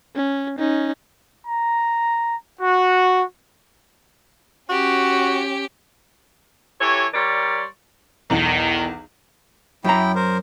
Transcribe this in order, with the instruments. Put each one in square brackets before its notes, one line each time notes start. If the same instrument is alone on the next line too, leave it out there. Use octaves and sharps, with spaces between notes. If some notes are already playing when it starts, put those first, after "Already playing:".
[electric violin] C#4
C#4 D#4
[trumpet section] A#5
F#4
[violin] C#4 G4 [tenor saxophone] F#4
[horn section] E3 G4 A4 C#5
G3 A#4 C#5 D5 C6
[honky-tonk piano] B1 E2 F#7 [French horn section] D#3
[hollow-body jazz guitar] F#2 A#5 [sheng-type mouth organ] E4 G5
[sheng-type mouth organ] A#4 C5